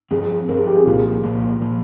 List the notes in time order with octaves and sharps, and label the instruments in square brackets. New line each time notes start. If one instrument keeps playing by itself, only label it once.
[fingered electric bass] G2 F3 C4 [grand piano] G#4
[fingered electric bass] G2 F3 C4 [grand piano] A#4
[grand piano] G#4
G4
G#4
[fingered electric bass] C2 A#2 F3 A#3 [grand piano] F4
[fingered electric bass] C2 A#2 F3 A#3
A#2 F3 A#3